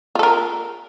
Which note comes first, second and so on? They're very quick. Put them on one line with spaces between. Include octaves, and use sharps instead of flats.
F4 A4 A#4